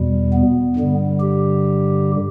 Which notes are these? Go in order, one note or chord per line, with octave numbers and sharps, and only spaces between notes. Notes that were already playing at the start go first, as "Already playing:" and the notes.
Already playing: E2 B2 G3
B3
G2 D3 G3
G4